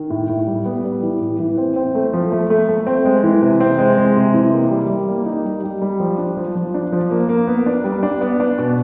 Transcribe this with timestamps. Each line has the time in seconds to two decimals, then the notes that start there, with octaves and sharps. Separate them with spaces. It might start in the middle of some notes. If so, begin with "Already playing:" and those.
Already playing: D#3
0.10 A2
0.29 A2
0.47 G3
0.66 B3
0.84 G3
1.03 E3
1.21 A2
1.40 E3
1.58 C4
1.76 C4
1.95 A3
2.14 F3
2.32 A3
2.50 A3
2.69 A3
2.87 C4
3.05 G#3
3.24 E3
3.42 C3
3.60 C4
3.79 G#3
3.98 G#3
4.16 C3
4.34 E3
4.53 A#3
4.71 G3
4.90 G3
5.09 A#3
5.26 D#4
5.45 G3
5.64 G3
5.82 G3
6.00 F3
6.18 D4
6.37 F3
6.55 F3
6.74 D4
6.92 F3
7.11 A#3
7.29 A#3
7.48 B3
7.66 D4
7.84 G3
8.03 D4
8.21 B3
8.40 D4
8.58 B2